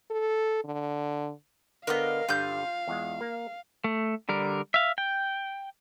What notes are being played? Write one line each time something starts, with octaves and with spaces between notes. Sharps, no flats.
A4
D3
D3 B3 A#4 C#5 D#5 F5
G2 D3 G3 F4 G6
E2 G#3
A#3
A3
D3 G3 A#4
E5 F5
G5